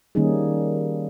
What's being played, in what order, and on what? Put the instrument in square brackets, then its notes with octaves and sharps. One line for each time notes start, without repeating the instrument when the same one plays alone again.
[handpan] D#3 G3 A#3 C#4 D#4 G#4